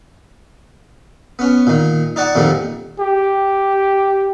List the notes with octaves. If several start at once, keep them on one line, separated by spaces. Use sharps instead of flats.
B3 C#4
A#2 D#3
D#4 D5 F#5 A5 C#6
F2 A#2 D#3 F3 G3
G4